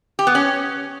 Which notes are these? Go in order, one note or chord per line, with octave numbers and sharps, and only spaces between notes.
G4
B3
C#4